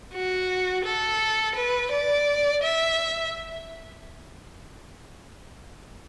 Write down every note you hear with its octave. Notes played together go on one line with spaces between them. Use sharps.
F#4
A4
B4
D5
E5